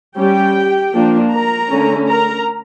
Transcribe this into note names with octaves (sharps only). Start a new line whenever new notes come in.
G3 C#4 G4 G5
F3 A#3 D4
A#4 A#5
D3 A3 C#4
A#4 A#5